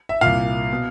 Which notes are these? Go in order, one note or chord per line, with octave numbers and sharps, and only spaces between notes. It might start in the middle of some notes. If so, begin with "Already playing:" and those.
E5
C2 A#2 F5
B2